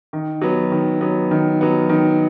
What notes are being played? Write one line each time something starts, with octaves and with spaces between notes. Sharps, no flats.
D#3
F#3 B3
D#3
F#3 B3
D#3
F#3 B3
D#3